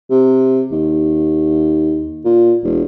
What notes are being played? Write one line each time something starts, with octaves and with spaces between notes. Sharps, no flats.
C3
D#2
A#2
E1